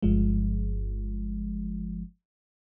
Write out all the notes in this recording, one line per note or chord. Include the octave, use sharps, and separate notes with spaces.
G1 G2 F3 G#3